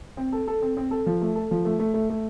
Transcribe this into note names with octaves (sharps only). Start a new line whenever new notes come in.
C4
A4
A4
C4
C4
A4
F3
A3
A4
F3
A3
A3
A3
A3